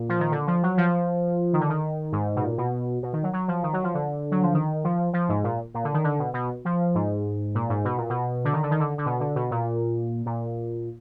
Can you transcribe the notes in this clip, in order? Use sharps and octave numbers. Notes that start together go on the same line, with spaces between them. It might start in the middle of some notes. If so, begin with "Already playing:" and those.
Already playing: A#2
F3
D#3
D3
F3
F#3
F3
D#3
D3
D#3
G#2
B2
A#2
B2
B2
D#3
F#3
F#3
F3
D#3
F#3
F3
D3
F#3
F3
D#3
F3
F3
G#2
A#2
A#2
D3
D#3
D3
B2
B2
F3
G#2
A#2
G#2
B2
A#2
B2
D3
D#3
D3
D#3
D3
D3
B2
D3
B2
A#2
A#2